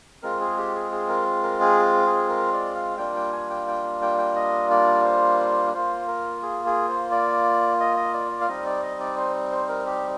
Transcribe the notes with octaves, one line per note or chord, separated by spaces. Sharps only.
G#3 C4 F4 A#4
G#4
G4
G#4
G#4
A#4
A#4
G#4
G#4
A#4
D5
F5
G3 A#3 D4 F4 G5
G5
G#5
G5
G5
G5
G5
D#5
D5
C5
A#3 F4 C5
A#4
G#4
G#4
C5
D5
D#5
D#5
D5
D5
F5
G3 C4 D#4 D#5
D5
D#5
D5
C5
C5
A#4
G4